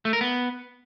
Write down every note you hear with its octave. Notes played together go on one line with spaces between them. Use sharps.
A3
A#4
B3